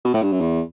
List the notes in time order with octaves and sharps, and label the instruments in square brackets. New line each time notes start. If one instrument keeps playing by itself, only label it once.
[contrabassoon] B2
A2
G2
F#2
E2